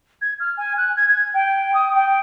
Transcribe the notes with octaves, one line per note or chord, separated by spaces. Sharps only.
G#6
F6
G#5
F#6
G#6
G#6
G5
D#6
G5